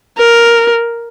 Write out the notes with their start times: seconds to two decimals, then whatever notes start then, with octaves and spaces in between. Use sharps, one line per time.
0.18 A#4